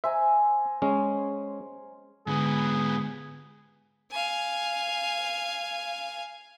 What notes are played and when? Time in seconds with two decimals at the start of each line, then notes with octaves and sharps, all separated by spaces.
0.04 C5 E5 G#5 A#5
0.82 G#3 C#4
2.27 G#2 D3 G#3 B3 G#4
4.11 F5 G#5